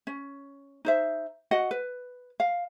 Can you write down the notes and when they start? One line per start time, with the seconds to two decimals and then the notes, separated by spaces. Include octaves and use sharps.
0.07 C#4
0.85 D#4 C5 E5
1.51 F#4 D#5 F#5
1.71 B4
2.40 F5